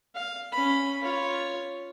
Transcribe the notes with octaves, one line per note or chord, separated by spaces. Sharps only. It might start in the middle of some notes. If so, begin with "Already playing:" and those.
F5
C#4 B5
F4 C#5